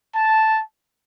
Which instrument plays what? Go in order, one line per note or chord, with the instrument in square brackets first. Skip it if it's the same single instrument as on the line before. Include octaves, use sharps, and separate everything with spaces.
[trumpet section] A5